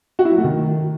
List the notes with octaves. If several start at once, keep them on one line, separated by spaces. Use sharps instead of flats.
F#4
E4
F#3
A3
D#3